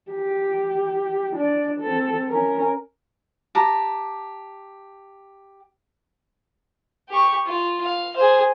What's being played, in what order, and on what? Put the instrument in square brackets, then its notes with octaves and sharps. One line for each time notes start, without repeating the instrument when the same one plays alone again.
[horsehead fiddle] G4
D4 D5
C4 A4
C#4 A#4
[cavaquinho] G4 A5 A#5
[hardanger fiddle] G4 C#6
F4
F5
G#4 C5